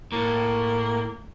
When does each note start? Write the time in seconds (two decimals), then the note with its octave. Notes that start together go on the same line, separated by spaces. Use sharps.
0.13 A2 A#3